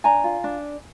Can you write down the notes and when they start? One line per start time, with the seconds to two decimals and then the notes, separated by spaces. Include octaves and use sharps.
0.04 D4 G#5 A#5
0.24 F4
0.44 D4